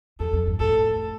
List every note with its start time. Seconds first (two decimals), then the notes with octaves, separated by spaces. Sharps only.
0.20 F2 A4
0.33 F2
0.47 G2
0.60 A2 A4